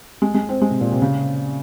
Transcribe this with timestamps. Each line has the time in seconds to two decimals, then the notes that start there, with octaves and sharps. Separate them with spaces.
0.22 G#3
0.34 G#3
0.49 C4
0.62 G#3
0.71 C3
0.81 A#2
0.92 C3
1.02 C#3